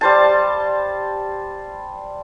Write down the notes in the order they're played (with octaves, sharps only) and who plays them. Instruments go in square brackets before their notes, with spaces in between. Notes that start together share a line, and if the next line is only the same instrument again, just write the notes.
[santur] G3 C5 A5